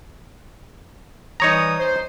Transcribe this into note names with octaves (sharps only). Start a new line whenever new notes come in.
E3 G3 D#4 C#5 A#5 D#6
C5